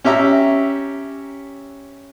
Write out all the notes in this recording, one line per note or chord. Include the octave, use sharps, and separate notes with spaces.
C#4 G4 E5 A#5